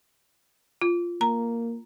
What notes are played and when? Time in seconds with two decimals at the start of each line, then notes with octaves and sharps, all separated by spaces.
0.81 F4
1.21 A#3 A#5